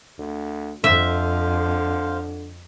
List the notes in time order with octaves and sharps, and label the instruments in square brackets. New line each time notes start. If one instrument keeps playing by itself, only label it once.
[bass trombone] D2
[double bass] F2 [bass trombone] D3 [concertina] C5 F5 [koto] E5